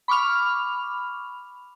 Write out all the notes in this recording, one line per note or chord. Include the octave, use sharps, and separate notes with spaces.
B5 C#6 D6 F6 F7